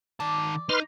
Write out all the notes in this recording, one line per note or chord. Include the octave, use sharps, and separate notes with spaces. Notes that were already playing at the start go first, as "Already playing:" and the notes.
D#3 D5 A5
D#4 B4 C6 F6